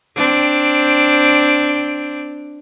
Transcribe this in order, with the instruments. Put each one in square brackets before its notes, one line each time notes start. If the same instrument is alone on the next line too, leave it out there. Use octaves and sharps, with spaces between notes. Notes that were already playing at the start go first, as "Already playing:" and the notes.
[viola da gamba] C4 D4